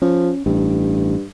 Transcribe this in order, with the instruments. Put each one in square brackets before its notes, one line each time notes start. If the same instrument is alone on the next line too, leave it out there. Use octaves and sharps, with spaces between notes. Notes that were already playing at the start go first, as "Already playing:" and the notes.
[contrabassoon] F3 [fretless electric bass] C#4
[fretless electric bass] A1 [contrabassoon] G2